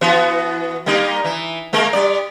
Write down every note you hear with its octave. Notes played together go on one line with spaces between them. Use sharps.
E3 B3 F#4
G3 A#3 D#4
E3
G#3 A#3 A#4
G3 D5